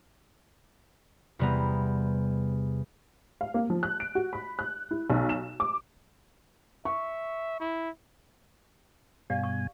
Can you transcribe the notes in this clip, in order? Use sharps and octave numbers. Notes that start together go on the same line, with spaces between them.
E2 C3 G3 B3 A#5
F5
A#3
F3
F#6
D7
F#4
B5
F#6
E4
B1
E7
D6
E5 C#6
E4
G2 B2 G4 D5 F5 G#5
C#6